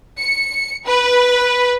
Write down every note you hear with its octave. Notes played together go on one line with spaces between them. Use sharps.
C#7
B4